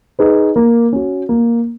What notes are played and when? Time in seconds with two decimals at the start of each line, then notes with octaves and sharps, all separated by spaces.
0.19 D#4 G#4 B4
0.56 A#3
0.93 C#4 F#4
1.29 A#3